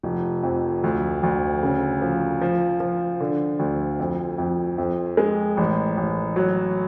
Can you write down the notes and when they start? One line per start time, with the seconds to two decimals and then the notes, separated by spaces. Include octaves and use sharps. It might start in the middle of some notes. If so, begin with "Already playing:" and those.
0.03 F1
0.43 F2
0.83 D2
1.23 D2
1.63 C#3
2.02 F3
2.41 F3
2.80 F3
3.20 D3
3.59 D2
3.99 F2
4.38 F2
4.78 F2
5.17 G#3
5.57 A1
5.97 A1
6.36 F#3